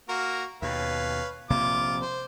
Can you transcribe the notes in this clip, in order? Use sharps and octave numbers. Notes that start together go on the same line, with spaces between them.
A#3 F#4 A#4
D#2 B2 B4 C#5 F5
A#1 C3 A#3 F4 D6
C5